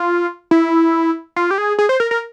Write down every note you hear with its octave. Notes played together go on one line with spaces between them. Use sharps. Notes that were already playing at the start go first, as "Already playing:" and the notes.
Already playing: F4
E4
F4
G4
G#4
G#4
C5
A#4
A#4